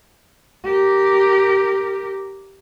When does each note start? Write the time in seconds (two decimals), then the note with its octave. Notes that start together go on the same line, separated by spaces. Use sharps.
0.65 G4 A#4